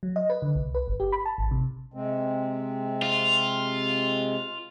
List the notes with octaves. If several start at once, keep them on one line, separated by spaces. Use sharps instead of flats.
F#3
D#5
B4
D3
C2
B4
G1
G4
B5
A5
G#1
C3
C3 G#3 C4
F4